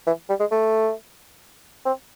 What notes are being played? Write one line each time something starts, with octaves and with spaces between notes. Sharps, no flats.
E3
G3
G#3
A3
C4